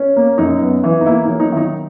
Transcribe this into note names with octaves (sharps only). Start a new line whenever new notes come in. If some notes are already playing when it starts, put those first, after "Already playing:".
Already playing: C#4
A#3
F#2 D#4
B3
E3
D#4
A#3 E4
D#4
F#3
D#4
D#3 D#4 E4